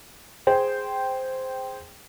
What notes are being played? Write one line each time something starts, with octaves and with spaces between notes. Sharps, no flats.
G#4 C5 G5